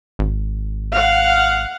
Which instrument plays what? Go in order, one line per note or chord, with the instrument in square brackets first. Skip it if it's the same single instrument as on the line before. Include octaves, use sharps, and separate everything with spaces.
[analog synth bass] G#1
[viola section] F5 F#5